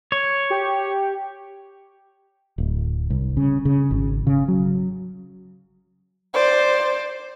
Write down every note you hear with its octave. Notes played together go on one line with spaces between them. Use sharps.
C#5
G4
D1
C2
C#3
C#3
G#1
C#3
F#3
C5 D5